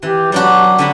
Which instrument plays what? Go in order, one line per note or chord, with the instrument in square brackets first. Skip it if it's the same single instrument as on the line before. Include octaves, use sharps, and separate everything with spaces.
[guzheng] E3 [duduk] G4
[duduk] F#3 [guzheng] G3 D4 F#4
[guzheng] D3 F#3 B5